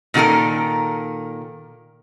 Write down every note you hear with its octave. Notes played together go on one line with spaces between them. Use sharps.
A#2 D#3 F#4 A4 A#4